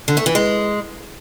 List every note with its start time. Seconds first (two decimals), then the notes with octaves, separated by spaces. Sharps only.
0.08 D3
0.17 A3
0.26 E3
0.35 G#3